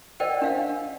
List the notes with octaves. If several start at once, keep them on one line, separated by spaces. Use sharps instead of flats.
A#4 C5 D5 D#5 F#5 G5
D4 F5 F#5